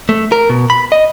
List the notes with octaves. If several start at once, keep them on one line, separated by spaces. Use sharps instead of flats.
A3
A#4
B2
B5
D#5